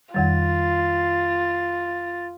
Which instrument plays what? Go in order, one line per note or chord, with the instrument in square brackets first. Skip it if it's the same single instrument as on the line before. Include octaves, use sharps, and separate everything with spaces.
[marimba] F2 D#3 G3 [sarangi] F4 [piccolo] A6